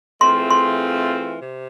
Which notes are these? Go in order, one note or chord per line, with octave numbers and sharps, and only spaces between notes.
E3 A3 C4 F4 G#4 C6
C6
C3